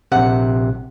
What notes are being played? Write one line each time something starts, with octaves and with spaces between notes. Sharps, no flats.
A#1 C3 F#5